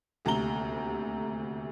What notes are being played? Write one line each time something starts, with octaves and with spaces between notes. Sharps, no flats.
D#1 D2 C3 A#5 G7